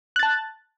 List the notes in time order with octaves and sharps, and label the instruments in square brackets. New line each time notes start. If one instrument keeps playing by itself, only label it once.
[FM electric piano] F#6
A6
A5